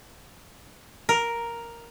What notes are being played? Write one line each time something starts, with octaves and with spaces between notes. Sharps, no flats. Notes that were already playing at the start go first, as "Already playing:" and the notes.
A#4